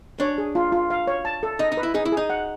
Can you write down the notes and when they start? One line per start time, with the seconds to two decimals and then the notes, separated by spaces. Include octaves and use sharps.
0.20 D4 C#5
0.38 G#4
0.55 F4
0.72 F4
0.90 F5
1.07 C#5
1.25 A5
1.43 A4
1.59 D#4 D#5
1.72 D#4
1.77 B4
1.83 E4
1.94 D#4 G#4
2.05 E4
2.12 D#4 G#4
2.30 F#5